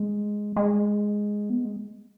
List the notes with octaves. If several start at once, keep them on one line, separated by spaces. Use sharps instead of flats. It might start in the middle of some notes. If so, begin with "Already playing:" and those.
Already playing: G#3
G#3
B3
G#3